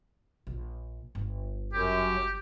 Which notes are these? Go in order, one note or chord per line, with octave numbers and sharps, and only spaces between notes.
A#1
G1
F#2 G4